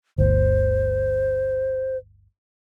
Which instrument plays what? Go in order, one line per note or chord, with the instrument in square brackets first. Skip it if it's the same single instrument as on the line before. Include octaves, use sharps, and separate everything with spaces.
[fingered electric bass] G1 D2 [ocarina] C5